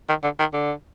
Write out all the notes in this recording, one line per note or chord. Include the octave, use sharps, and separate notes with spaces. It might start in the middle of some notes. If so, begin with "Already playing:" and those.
D#3
D3
D#3
D3